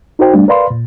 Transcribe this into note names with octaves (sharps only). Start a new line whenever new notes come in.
D#4 F#4 A#4 C5 G5
G3 A3 D4
A#4 B4 D5 F5 B5 C6
A#2